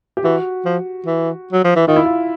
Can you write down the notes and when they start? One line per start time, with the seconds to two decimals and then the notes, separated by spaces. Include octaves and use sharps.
0.17 G4
0.24 E3 F#4
0.65 F3
1.06 E3
1.53 F#3
1.64 F3
1.76 E3
1.87 D#3 F4
1.96 E4
2.05 F4